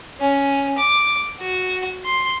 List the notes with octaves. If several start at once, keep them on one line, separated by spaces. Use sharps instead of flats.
C#4
D6
F#4
C6